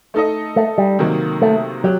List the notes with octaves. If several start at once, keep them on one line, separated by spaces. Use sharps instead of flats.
A3 D#4 A4 D#5
A3
G3
C3 D#3 F#3 A#3 D#4
A3
F#3 G4